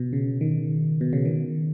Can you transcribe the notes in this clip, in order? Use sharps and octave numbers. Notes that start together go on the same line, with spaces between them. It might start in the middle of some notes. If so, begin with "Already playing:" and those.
Already playing: B2
C#3
D#3
B2
C#3
D#3